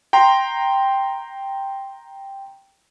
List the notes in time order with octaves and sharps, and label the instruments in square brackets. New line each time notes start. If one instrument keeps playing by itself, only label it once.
[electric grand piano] G5 A#5 C6